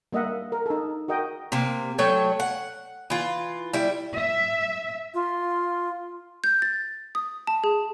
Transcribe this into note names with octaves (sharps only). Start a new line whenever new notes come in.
G3 A#3 D#5 E5 F#5
A#4
D#4 A4
F#4 A#4 D#5 G5
C3 A#3
F#3 A3 C#5 G5
F#5
E3 F4
G3 E4
E5
F4
G6
A6
D#6
A5
G#4